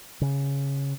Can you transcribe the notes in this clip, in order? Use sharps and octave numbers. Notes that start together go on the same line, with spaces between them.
C#3